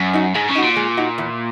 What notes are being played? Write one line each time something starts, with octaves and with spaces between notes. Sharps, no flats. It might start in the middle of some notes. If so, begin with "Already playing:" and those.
Already playing: F#2
D#4 F#4
G#2 G#3
C#3
D#4 F#4
A#2
G#3
D#4 F#4
E2